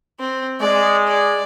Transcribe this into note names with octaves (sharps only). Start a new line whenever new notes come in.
C4
G#3 D5
D5